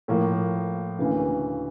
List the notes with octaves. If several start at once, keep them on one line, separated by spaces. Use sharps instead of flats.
A2 F3 A#3
D2 C#3 E3